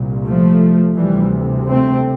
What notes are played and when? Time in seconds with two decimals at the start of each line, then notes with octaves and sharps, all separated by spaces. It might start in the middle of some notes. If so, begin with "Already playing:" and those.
Already playing: C2 A#2
0.26 F3 A3
0.98 D2 C3 E3 G3
1.70 A3 C4